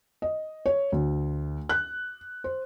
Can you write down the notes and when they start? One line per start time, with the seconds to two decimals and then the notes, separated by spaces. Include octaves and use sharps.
0.22 D#5
0.66 C#5
0.92 D2
1.69 F#6
2.44 C5